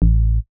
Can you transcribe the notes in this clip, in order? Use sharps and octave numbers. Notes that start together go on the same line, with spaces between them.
A1